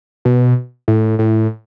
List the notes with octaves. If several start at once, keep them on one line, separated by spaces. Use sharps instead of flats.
B2
A2
A2